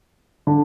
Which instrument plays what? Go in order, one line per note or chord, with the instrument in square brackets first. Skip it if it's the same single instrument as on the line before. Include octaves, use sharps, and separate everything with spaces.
[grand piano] D3